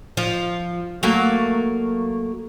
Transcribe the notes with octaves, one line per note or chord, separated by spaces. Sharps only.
F3
F#3 A3 A#3